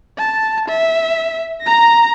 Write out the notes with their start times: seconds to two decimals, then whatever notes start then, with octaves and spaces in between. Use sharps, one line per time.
0.18 A5
0.68 E5
1.62 A#5 A#6